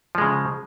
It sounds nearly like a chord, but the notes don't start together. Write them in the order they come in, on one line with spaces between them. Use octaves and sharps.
F3 G#3 C#3